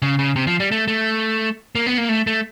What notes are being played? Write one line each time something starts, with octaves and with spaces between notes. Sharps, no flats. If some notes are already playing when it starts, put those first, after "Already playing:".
C#3
C#3
C3
F3
G3
A3
A3
A#3
B3
A#3
A3
A3